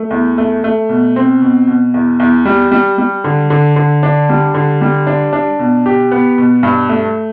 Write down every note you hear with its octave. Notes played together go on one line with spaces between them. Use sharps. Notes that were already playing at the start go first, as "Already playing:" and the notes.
Already playing: A3
E2
A3
A3
B2
C4
B2
B2
E2
E2
G3
G3
G3
D3
D3
D3
D4
G3
D3
G3
D4
D4
B2
G4
B3
B2
G2
A3